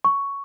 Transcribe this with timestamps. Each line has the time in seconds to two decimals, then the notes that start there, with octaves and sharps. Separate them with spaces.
0.05 C#6